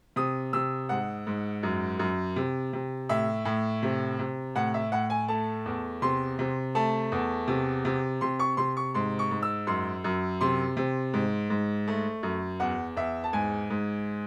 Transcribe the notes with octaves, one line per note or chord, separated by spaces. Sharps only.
C3 D#6
C3 E6
G#2 F#5
G#2
F#2
F#2
C3
C3
A2 E5
A2
C3
C3
A2 F#5
E5
A2 F#5
G#5
A3 A5
E2
C3 C6
C3
A3 A5
E2
C3
C3
C3 C6
C#6
C3 C6
C#6
G#2 C6
C#6
G#2
E6
F#2 C6
F#2
C3 C6
C3
G#2
G#2
A3
F#2
E2 F#5
E2 E5
A5
G#2 G#5
G#2